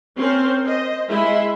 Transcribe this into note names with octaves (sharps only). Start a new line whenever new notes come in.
C4 C#4 A#4 C5 C6
C5 D#5
G#3 E4 E5 B5 C6